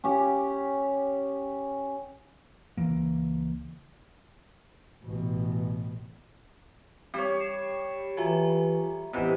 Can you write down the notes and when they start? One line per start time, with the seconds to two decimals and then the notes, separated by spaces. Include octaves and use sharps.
0.04 C#4 G4
2.77 C#2 E3 A#3
5.04 A1 B2
7.14 G3 C4 C#5
7.40 C7 E7
8.17 E3 F4 F#4 A4 E5 G#5 A#5
9.13 A1 C3 E3 B3 D#5